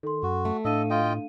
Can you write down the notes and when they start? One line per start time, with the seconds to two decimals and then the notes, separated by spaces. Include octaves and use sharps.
0.03 D#3 A4 C6
0.23 F#2 F#4
0.45 A3
0.65 A2 D4 A4 D#5 F5 D#7
0.90 F4 D#5 G5